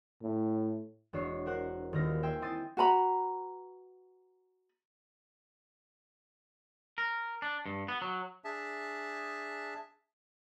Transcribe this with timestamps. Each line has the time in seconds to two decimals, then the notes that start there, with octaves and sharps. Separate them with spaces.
0.22 A2
1.13 E1 D4 F#4 C#5 C7
1.46 A#4 C5 F#5 F#6
1.93 D#1 D#2 F6 A#6
2.23 E5 G5 G#5 C6 E6
2.41 C4 E4 C6 D#6 A6 D#7
2.77 F#4 B4 A#5 B5
6.98 A#4
7.42 D4
7.66 G2
7.88 B3
8.02 F#3
8.44 D4 G#4 E5 A5